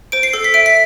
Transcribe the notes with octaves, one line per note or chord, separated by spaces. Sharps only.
C5 D7
C7
A4 C7
B6
E5 D7
B6